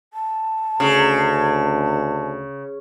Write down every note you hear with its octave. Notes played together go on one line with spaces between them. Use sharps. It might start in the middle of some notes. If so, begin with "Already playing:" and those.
A5
D2 C#3